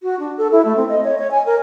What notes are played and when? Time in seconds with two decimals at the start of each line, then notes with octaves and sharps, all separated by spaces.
0.03 F#4
0.20 D4
0.38 A4
0.52 E4
0.65 A3
0.76 C4
0.89 D#5
1.04 C#5
1.18 C#5
1.31 G#5
1.46 A#4